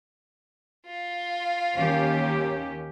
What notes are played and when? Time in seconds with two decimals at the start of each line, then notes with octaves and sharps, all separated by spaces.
0.86 F4
1.75 D#2 C#4 G4